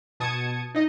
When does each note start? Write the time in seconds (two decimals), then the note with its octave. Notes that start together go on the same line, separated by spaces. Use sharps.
0.20 B2 A5 D#6 G#6 C#7
0.75 D#4 D#5